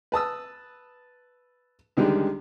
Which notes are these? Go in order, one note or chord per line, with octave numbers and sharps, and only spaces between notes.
B4 A5 D#6 E6
C#2 D3 D#3 G3 G#3